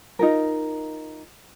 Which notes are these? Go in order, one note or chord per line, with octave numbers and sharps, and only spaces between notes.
D#4 F4 A#4